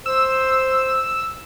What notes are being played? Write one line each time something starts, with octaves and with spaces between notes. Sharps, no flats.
C5 E6